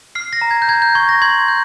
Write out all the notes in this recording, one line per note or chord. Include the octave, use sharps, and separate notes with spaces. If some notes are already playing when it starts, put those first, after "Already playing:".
F6 C7
A#6
A#5
G#6
G6
A#5 G#6
G6
C#6 G#6
A#6
C6 G#6
G6